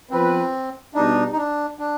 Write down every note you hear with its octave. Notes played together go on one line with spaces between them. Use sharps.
F3 B3 C4 F4 B4
B2 G3 B3 D4 D#4
D#4
D4
D4